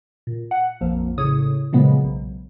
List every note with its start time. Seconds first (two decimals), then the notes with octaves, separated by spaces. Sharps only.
0.27 A#2
0.51 F#5
0.81 A#1 F2 F3 A#3
1.18 A2 C#3 C#5 D#6
1.73 A#2 C#3 F3 F#3 G#3 B3
2.04 B1